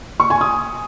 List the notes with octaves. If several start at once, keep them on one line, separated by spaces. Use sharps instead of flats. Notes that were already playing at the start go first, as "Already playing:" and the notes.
C#6
G#5
D#6